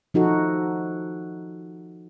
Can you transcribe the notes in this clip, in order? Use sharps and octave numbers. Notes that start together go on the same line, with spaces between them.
F3 D#4 F#4 A4